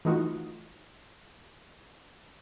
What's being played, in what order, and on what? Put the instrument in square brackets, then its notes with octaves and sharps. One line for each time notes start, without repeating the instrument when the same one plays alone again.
[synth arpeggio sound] E3 A3 D#4 F4 F#4